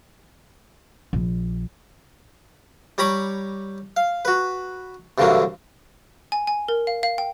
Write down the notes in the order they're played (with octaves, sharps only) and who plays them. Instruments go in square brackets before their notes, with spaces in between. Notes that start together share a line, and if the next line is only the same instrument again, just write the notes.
[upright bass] A#1
[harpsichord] G3 C#5 A#5 B5 C#6 D6
F5
F#4 B4
C2 G2 D3 E3 F#3 A#3
[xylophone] G#5
G#5
A#4
F5
F5
G5